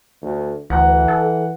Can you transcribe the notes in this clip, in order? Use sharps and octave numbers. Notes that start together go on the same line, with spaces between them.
D2
D2 E3 F#5 A#5
A4